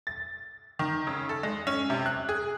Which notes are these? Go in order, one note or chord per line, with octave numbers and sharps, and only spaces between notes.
A6
D#3
C#3
A4
G#3
C#4
C3
F#6
G#4